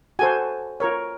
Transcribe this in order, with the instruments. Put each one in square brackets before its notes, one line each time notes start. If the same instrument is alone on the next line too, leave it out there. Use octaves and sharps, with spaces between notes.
[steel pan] F#4 A4 C5 G#5
F4 A#4 C#5